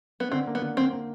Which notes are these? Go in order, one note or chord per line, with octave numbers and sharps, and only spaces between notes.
B3
D3 C4
A#3
B3
D3
D3 C4
A#3